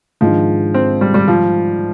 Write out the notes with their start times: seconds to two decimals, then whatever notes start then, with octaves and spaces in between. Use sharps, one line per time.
0.21 G#2 D#3 F3 G#3 D4
0.74 C4
1.01 G3
1.14 G3
1.28 F3